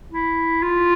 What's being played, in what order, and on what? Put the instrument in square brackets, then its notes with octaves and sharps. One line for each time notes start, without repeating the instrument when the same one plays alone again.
[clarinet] E4
F4